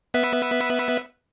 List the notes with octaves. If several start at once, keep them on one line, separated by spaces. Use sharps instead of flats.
B3 B4 E5